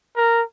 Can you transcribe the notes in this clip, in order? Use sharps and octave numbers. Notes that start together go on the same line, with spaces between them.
A#4